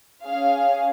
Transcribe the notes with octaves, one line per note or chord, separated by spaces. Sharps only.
C#4 G#4 F5